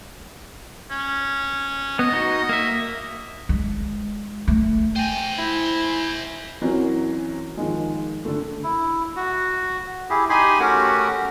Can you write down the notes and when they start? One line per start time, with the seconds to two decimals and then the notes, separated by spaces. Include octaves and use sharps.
0.91 C#4
1.99 B3 D#5
2.13 D#4 F#4
2.49 A#3 E5
3.49 G#3
4.48 A3
4.96 C5 G5 G#5
5.38 E4
6.62 E3 F#3 C4 C#4 F#4 A#4
7.57 D#3 F3 G#3
8.25 D3 A3
8.64 E4
9.16 F#4
10.10 E4 G4 G#4
10.29 D#4 G4 G#5 B5 C6 D#6
10.60 A3 C#4 F#4 G4 A#4 F#5